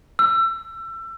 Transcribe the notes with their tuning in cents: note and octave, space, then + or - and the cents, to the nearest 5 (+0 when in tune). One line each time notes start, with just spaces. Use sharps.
E6 +30